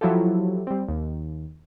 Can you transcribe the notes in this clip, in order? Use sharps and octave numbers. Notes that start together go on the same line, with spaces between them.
F3 F#3 E4 F4 G4 A4
G3 C4
D#2